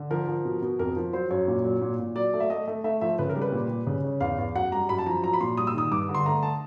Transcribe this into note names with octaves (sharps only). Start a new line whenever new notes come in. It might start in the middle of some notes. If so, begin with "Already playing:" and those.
Already playing: D3
F3 A#4
F3
B2
B2
F2 A#4
F3
F#3 C5
F#2 C#5
A#2
F#3
A#2
A#2
F#3 D5
A3
E5
A3 D#5
A3
A3 E5
F3 E5
C#3 B4
A#4
G3
B4
A#2
G3
C#3
C#4
E2 F5
E2
F#2 F#5
G3 A#5
F#2 B5
A5
F3 A#5
F#3 A#5
B5
A#2 C6
G3 D#6
E6
D#3 D#6
G2 D6
D3
C6
A3 A#5
A5